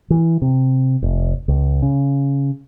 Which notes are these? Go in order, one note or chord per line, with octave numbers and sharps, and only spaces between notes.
E3
C3
F1
C#2
C#3